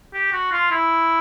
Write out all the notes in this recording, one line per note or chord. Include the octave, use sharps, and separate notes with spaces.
G4
F#4
F4
E4